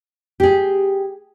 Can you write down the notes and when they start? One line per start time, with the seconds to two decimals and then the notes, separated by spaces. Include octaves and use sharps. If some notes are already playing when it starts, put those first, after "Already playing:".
0.40 G4 G#4